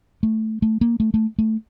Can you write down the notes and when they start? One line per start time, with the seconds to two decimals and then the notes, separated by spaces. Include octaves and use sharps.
0.23 A3
0.62 A3
0.81 A#3
1.00 A3
1.14 A3
1.38 A3